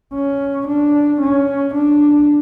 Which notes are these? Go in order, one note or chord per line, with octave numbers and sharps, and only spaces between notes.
C#4
D4
C#4
D4